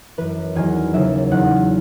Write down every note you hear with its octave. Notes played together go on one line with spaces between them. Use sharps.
F#2 E3 B4
E2 D#3 F#3 G#5
D#2 C#3 F#3 E5
E2 D#3 F#3 F#5